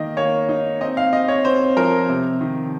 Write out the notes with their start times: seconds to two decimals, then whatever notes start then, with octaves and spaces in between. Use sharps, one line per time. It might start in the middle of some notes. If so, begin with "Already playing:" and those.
Already playing: D#3 A#3 D#5
0.17 A#3 C#5
0.49 D#4
0.81 C4 D#5
0.97 F5
1.13 C4 D#5
1.28 C#5
1.45 C4 C5
1.77 F3 A#4
2.09 C3
2.41 D#3